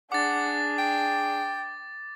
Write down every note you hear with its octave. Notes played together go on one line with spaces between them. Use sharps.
D4 G#4 F#5 D6 A6
G5